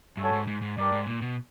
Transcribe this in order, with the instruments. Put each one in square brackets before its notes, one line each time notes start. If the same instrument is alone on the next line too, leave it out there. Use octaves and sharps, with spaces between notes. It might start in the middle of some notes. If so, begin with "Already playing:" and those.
[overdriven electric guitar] G2 [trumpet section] A3 C#4 F#4 A4 C#5
[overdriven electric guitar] G#2
G#2
G#2
[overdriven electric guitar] G2 [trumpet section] D4 G4 A#4 D5
[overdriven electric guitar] G#2
A#2
B2